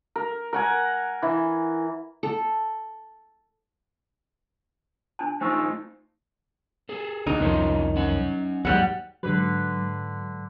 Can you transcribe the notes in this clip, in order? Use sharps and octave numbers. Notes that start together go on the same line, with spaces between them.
A#4
A#4 F#5 G#5
E3
A4
D4 G#5 A5
A3 D#4 F4 C5 G#5 C#6 E6
G#4 A4
D2 D#4
C2 F2 D#3 C4 C#4 F4
C#4 F#5
D#2 G#2 F#3 G3 F#5
G#2 D3 F#3 B4